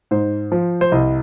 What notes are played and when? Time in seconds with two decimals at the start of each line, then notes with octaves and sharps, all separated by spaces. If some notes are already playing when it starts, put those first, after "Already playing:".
0.11 G#2 C5
0.52 F3
0.81 C5
0.92 C2 D#5